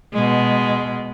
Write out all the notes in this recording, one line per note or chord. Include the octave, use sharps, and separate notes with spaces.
B2 G#3